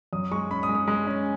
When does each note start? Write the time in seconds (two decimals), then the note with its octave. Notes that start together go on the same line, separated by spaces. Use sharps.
0.13 F#2 D#6
0.31 G#3 C#6
0.50 C#4 B5
0.63 D#6
0.69 G#3
0.75 D#6
0.88 G#3
1.07 C#4